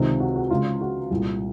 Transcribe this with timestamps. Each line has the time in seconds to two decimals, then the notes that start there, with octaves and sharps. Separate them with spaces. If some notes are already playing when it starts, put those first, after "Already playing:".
Already playing: C#2 C3 D#3
0.20 F#4
0.36 F#4
0.50 C#2 C#3 F4
0.81 F#4
1.11 C2 A#2